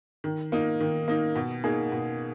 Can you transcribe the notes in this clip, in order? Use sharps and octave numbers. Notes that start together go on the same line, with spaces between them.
D#3
A#3 D#4
D#3
A#3 D#4
B2
A#3 D#4 G#4
B2